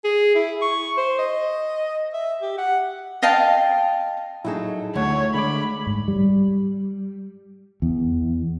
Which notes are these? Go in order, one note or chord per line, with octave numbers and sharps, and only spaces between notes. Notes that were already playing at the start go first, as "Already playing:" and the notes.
G#4
E4
C#6
C5
D#5
E5
G4
F#5
D#5 F5 G5 A5
F#3 D#4 E4 G#4 A4
D2 A3 C#5 F#5
D3 G#3 B5 D6
G#2
G3
E2